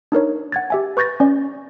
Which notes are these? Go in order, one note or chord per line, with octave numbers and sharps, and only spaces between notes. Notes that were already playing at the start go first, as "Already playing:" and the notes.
D4 D#4 A#4 C#5
F#5 G#6 A6
G4 E5 G#5
B4 C#6 G6 A6 A#6
C#4 D5